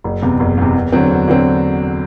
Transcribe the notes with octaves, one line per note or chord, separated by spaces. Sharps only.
F#1
E2 C3
F#1
E2 C3
E2
D3 F#3 C4
E2
D3 F#3 C4